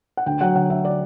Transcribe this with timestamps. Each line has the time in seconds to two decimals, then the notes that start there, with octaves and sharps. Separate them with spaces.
0.17 F#5
0.26 D2 G5
0.41 F#3 F#5
0.56 D3 F#5
0.70 D2 E5
0.85 D5